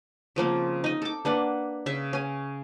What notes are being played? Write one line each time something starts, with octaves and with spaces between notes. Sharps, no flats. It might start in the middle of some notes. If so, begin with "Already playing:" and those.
C#3 F3 A#3 C4
D#4 D#5
A4 D6
A#3 D4 B4 F#5
C#3 E5
C#4 G#5